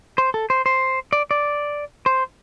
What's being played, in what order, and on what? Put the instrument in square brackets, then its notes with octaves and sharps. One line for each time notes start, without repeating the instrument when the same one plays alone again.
[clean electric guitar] C5
A4
C5
C5
D5
D5
C5